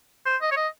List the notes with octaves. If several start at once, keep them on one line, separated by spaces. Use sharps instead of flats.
C5
D#5
C#5
D#5